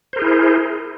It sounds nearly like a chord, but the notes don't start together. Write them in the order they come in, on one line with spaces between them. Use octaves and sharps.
C5 A#4 G#4 E4